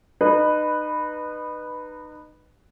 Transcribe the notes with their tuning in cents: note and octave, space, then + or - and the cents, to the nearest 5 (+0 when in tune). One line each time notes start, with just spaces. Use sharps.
D#4 -30 B4 +0